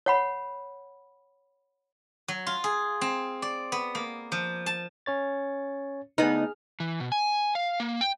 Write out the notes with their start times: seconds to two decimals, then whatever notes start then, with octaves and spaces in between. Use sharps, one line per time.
0.06 C#5 F#5 B5
2.28 F#3
2.47 F4
2.64 G#4
3.01 C4
3.42 D5
3.72 B3
3.95 A#3
4.32 F3
4.66 A5
5.06 C#4 C#5 A6
6.18 D2 B3 D#4 G#4 F6
6.80 E3
7.00 B2
7.12 G#5
7.55 F5
7.80 A#3
8.01 G5